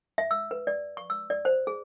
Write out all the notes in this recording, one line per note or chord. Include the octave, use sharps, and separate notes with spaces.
E5
E6
B4
D5
C#6
E6
D5
C5
G#4